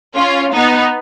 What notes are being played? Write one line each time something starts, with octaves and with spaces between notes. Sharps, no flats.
C#4 F4
B3 D#4